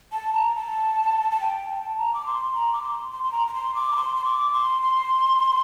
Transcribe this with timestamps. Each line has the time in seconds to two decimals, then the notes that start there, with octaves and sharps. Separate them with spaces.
0.13 A5
0.34 A#5
0.56 A5
1.31 A5
1.41 G5
1.69 A5
1.98 A#5
2.14 D6
2.26 C6
2.54 A#5
2.73 D6
2.83 C6
3.11 C6
3.24 C6
3.32 A#5
3.47 A#5
3.54 C6
3.75 D6
3.93 A#5
3.96 C6
4.16 C6
4.25 D6
4.53 C6
4.82 C6